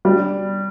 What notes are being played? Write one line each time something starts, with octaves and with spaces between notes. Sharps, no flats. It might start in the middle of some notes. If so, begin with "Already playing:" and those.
G3